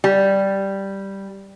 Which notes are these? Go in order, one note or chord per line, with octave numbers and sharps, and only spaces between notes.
G3